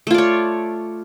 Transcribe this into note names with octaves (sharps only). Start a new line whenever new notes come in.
A3 F4 C#5 D5